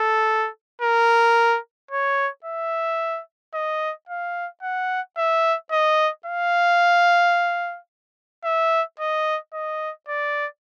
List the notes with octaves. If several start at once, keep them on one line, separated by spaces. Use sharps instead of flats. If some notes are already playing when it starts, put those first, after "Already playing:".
Already playing: A4
A#4
C#5
E5
D#5
F5
F#5
E5
D#5
F5
E5
D#5
D#5
D5